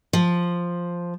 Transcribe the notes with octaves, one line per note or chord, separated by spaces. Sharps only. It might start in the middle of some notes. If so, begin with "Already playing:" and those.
F3